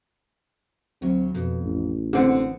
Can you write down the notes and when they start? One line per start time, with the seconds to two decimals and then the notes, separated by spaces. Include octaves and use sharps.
1.02 D2 F#3 C4
1.34 F2 B2
1.63 A1
2.13 D3 B3 C4 F#5